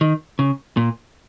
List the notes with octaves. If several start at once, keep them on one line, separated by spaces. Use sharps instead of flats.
D#3
C#3
A#2